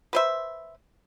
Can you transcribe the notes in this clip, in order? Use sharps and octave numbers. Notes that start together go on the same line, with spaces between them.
B4 C5 E5